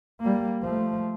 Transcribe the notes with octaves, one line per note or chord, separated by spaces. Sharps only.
G3 A#3
F3 A3